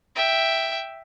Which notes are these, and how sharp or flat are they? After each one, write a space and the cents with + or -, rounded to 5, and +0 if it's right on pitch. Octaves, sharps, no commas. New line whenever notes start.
E5 +0 G5 +0